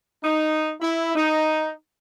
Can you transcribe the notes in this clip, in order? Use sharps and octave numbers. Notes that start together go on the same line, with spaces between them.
D#4
E4
D#4